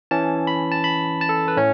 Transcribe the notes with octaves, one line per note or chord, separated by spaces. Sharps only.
E3 C#4 A5
B5
A5
B5
A5
A4
B4
A2 A3 C#4 C#5